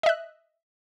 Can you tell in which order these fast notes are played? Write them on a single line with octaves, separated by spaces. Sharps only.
D#5 E5 F#6